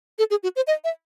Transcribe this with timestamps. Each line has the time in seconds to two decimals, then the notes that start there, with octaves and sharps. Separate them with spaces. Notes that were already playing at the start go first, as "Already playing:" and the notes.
0.19 A4
0.30 G#4
0.43 F#4
0.56 C5
0.67 D#5
0.84 E5